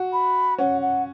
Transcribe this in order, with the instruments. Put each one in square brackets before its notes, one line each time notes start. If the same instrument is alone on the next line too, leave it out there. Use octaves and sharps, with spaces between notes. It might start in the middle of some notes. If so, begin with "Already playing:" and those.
Already playing: [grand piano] F#4
[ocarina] B5
[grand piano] C#4 [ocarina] F#5
[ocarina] F#5